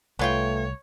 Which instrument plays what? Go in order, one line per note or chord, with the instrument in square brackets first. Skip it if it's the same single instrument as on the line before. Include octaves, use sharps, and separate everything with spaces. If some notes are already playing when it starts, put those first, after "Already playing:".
[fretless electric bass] C2 [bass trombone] A3 [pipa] B3 F4 G5 [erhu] C#5